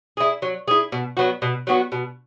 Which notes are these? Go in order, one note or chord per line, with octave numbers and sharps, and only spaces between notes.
E4 G#4
F#3
E4 G#4
B2
F#3 B3 F#4
B2
F#3 B3 F#4
B2